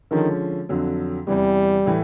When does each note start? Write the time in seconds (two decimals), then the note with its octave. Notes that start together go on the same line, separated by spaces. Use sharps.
0.11 D3 D#3 F3 G#3 C#4
0.69 F2 D3 F#3
1.27 E2 C3 E3 G3
1.86 A2 E3 A3